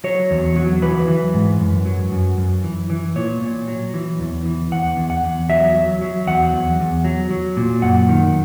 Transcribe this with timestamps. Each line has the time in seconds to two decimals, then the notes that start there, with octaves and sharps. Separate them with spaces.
0.04 F#3 C#5
0.31 E2
0.56 F#3
0.82 E3 B4
1.08 E3
1.34 G#2
1.61 F#2
1.86 F#3
2.12 F#2
2.38 F#2
2.64 E3
2.90 E3
3.16 A#2 C#5
3.41 A#2
3.68 F#3
3.94 E3
4.20 E2
4.46 E3
4.71 E2 F#5
4.97 E2
5.10 F#5
5.24 E2
5.49 F#3 E5
5.76 F#3
6.01 F#3
6.27 E2 F#5
6.53 E2
6.80 E2
7.05 F#3
7.31 F#3
7.57 A#2
7.82 F#2 F#5
8.09 D#3